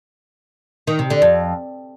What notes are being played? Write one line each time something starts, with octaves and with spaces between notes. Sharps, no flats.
D#3
C3
D3
F2